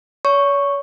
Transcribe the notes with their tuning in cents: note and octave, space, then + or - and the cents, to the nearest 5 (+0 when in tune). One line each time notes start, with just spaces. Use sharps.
C#5 +35 C#6 +0